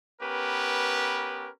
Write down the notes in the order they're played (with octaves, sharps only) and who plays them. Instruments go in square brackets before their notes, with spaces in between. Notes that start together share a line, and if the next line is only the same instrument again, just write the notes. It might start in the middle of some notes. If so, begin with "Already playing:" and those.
[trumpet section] B3 C#4 G4 A#4 B4